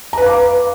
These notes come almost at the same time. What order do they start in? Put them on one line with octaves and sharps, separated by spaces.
A#5 B4 F5 D6